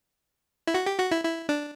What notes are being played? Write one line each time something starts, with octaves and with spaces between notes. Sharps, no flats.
E4
F#4
G4
F#4
E4
E4
D4